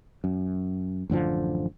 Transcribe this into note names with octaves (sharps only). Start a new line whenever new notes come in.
F#2
A1 F#2 D3 F3